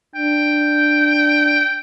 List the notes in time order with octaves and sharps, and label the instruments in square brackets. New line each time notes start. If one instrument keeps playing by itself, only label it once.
[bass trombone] D4 [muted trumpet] G5